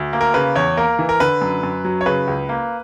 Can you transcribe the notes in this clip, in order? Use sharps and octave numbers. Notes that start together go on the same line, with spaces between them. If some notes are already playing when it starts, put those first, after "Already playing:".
Already playing: D2
A#3
A#4
C#3 B4
E2 C#5
A#3 A#4
E3
A#4
D3 B4
F#2
F#2
F#3
C#5
C#3 B4
C#2
A#3